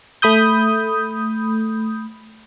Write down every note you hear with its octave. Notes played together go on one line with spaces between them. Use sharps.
A3 B5 D#6 G6